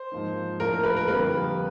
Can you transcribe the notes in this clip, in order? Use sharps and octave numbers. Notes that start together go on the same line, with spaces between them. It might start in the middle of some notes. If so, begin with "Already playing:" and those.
Already playing: C5
G#2 F3 A#3 D#4
A2 F3 A#3 D4 A#4
B4
A#4
F2 D3 G3 A#3 B4